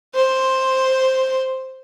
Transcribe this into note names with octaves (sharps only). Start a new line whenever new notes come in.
C5